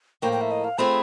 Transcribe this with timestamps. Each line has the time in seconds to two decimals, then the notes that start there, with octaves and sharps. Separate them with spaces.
0.22 A2 F3 A#3 G5
0.32 G5
0.41 E5
0.51 D#5
0.64 F5
0.78 A3 C4 F4 G#4 B5